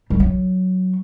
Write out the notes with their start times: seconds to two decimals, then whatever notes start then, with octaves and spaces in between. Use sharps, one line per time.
0.10 G3
0.20 F#3